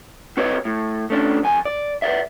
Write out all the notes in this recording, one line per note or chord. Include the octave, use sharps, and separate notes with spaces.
C4 F#4 B4 C#5 D#5
A2
A3 C#4 D4
F2 G#5
D5
B4 C5 D5 E5